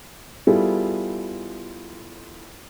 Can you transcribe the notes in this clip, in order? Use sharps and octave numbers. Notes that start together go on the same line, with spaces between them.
G3 B3 E4 F4 G#4 A4